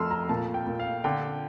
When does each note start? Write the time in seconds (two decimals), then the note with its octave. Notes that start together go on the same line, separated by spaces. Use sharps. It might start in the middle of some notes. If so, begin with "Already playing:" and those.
Already playing: F2 A3 C6 E6 F6
0.11 A#5
0.29 A#2 A5
0.54 G5
0.67 A#2
0.79 F5
1.04 D3 G5